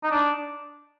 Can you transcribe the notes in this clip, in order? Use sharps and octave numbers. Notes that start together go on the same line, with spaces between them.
D#4
D4